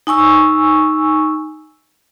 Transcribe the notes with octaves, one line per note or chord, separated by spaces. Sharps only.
D#4 G#5 C#6 E6